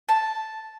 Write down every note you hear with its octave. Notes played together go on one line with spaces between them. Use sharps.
A5